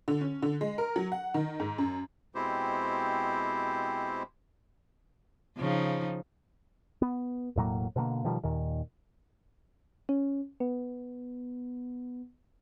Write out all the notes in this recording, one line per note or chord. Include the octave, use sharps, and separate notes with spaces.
D3
C#4
D3
G#3
A#4
F#3
F#5
D#3
G#2
F#2
B2 G#3 C4 E4 G4 C5
C#3 F3 D#4
B3
E1 A2 F#3 A#3
B2 D3 A3 A#3
B2 D#3 F3 G3
D#2 A#2 D#3
C#4
B3